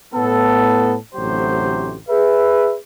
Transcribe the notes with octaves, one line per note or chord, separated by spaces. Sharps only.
A2 B3 A4
A1 D2 C3 F#3 G4 C5
G#4 B4 E5